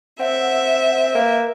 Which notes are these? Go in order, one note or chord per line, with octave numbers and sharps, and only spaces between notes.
C4 E5 F#5
A#3 B4